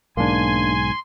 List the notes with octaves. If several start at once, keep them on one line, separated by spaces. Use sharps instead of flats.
B1 G#2 A#3 D4 G#5 C6